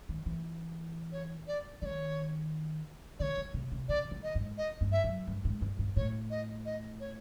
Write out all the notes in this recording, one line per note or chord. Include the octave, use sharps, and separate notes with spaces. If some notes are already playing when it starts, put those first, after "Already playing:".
D#3
E3
C#5
D5
D#3 C#5 D5
D3 C#5 D5
C#3
C3
C3
C#3 D5
D3
D#5
G#2
D#5
G2
E5
F#2
G2
G#2
G2
G2
A2 C#5
D#5
D#5
C#5